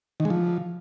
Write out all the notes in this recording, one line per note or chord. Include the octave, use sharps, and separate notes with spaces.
D#3
G#3
F3